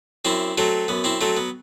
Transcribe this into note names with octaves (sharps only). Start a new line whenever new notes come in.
F#2 C4 E4
F#3 A3 C4
F#2 B3
C4 E4
F#3 A3 C4
B3